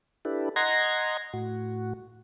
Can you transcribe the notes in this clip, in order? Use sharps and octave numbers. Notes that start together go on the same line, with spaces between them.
D4 E4 G4 A4 B4
D#5 F#5 A#5 C6 G#6 A#6
A2 F#4